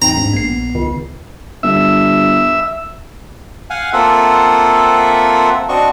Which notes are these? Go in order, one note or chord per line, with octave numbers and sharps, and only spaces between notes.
E2 C4 D#4 G5 A#5
G#2 D4
A#1 B3 C7
C#2 D#3
G1 E5
F5 F#5 G#5
A#3 C4 F4 A4 E5 F#5
C4 D4 F#4 D#5 C#6